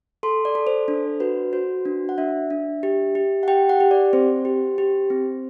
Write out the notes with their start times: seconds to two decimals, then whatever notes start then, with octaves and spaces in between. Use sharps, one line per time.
0.23 A4 C6
0.45 D5
0.55 A4
0.67 C5
0.88 D4
1.20 F#4 B4
1.53 F#4 C5
1.85 D4
2.09 F#5
2.18 D4 E5
2.50 D4
2.83 G4
3.15 G4
3.43 F#5
3.48 G4 G5
3.69 F#5
3.80 G4
3.91 D5
4.13 C4 C5
4.45 G4
4.78 G4
5.10 C4